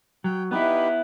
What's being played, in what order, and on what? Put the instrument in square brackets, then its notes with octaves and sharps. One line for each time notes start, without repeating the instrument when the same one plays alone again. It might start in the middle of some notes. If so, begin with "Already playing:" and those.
[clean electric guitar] F#3 [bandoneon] G5
[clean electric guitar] B3 E4 [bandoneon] D#4 G4 B4